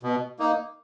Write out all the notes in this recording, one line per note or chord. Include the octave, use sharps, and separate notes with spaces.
B2
A#3 D#4